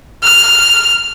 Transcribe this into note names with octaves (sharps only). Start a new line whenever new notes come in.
F6